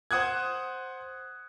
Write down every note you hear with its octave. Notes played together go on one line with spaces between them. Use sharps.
C5 F#5 D#6 F#6 G#6